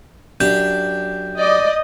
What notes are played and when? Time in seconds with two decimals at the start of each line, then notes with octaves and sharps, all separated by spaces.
0.40 F#2 D4 G4 G6
1.39 D5 D#5